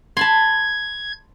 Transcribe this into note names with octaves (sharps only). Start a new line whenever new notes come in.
A5 B5 C6 G#6